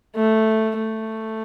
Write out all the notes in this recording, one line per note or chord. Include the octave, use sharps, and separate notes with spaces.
A3
A3